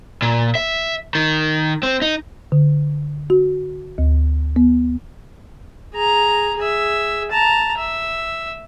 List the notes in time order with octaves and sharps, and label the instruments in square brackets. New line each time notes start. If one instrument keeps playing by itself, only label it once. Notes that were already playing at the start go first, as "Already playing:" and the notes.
[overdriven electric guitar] A#2
E5
D#3
C4
D#4
[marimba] D3
F#4
D2
B3
[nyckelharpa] G#4 A#5
G#4 E5
A5 A#5
E5